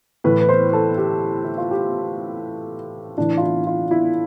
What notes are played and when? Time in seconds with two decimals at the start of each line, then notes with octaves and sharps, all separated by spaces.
0.24 A2 E3 B4
0.40 B4
0.49 C5
0.73 A4
0.98 G4
1.44 E4
1.58 F4
1.71 G4
3.17 A2 E3 D4
3.37 F4
3.42 E4
3.67 F4
3.91 E4